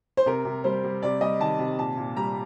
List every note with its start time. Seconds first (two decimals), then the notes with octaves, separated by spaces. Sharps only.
0.17 C5
0.26 C3 A#4
0.45 C3
0.64 G3 C5
0.84 G3
1.02 C3 D5
1.21 G3 D#5
1.40 D#3 A5
1.59 C3
1.78 A#2 A5
1.97 A#2
2.16 G3 A#5